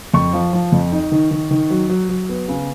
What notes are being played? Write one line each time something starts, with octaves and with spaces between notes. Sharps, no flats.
F2 C#6
F3
F3
F2
D#4
D#3
D#3
D#3
F#3
F#3
F#3
B3
C#3